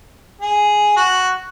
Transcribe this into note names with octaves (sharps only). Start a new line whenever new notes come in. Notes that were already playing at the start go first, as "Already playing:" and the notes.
G#4
F#4